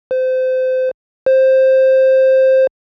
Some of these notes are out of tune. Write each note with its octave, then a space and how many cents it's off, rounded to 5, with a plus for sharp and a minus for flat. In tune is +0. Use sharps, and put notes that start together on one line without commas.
C5 -25
C5 +10